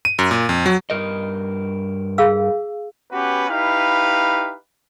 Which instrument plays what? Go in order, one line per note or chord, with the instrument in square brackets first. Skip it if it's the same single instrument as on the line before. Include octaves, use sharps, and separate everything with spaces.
[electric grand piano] D#7
F#2
A#2
F2
F#3
[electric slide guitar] G2 A#4 D#5
[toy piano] G#4 F5 E6
[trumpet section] B3 C#4 F#4 G4 B4
D#4 E4 G4 B4 F5